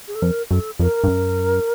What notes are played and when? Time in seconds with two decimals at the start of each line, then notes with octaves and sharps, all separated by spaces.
0.07 G#4
0.15 A4
0.22 F2 A#4
0.50 F#2 A4
0.79 F2 A#4
1.04 G2
1.08 F#2